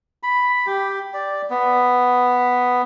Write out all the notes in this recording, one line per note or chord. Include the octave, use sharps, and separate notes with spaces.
B5
G4
D5
B3